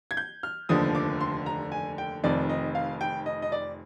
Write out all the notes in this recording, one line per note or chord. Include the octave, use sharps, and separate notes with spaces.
G#6
G6
F6
F1 D#2 D3 F3 D#6
D6
C6
A#5
G#5
G5
F1 F2 D#3 D5
D#5
F5
G5
D#5
D#5
D5